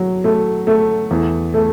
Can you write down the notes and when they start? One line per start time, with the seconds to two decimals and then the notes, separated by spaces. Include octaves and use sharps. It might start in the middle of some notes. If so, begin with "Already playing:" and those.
Already playing: F#3
0.24 A3
0.67 A3
1.11 E2
1.54 A3